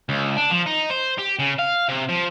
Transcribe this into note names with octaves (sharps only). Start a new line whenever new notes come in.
C#2
D4
F3
D#4
C5
G4
C#3
F5
C3
F3